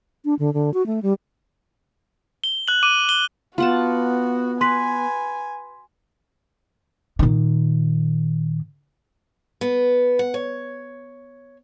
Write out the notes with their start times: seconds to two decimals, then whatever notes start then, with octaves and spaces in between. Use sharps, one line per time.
0.25 D4
0.39 D3
0.54 D3
0.74 F#4
0.86 A3
1.03 G3
2.44 G7
2.68 F#6 F#7
2.83 D6 D#7
3.09 G7
3.58 B3 F4 F#4 F#5 A5
4.61 B4 G#5 C6 B6
7.19 A#2 D#3
9.61 B3
10.19 F#5
10.34 C#5